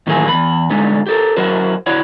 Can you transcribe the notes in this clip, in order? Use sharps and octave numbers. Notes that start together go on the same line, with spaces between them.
A2 D#3 E3 F#3 A#3 G#4
E2 B5
D3 G3 G#3 D#4
G4 A4 A#4
F#3 E4 F#4 A#4 C5
E4 F#4 C#5 D5 F#5